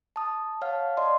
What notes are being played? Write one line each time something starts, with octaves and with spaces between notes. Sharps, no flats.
A5 D#6
C#5 F5 F#5 A5 F6
D5 D#5 C6